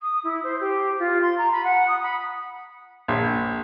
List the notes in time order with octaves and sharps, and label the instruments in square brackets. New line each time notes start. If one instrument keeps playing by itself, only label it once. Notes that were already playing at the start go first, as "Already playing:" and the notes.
[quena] D#6
E4
C5
G4
F4
C6
A#5
B5
F#5
D#6
B5
[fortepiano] A#1